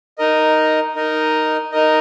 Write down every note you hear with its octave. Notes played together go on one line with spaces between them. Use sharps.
D#4 A#4 D#5
D#4 A#4 D#5
D#4 A#4 D#5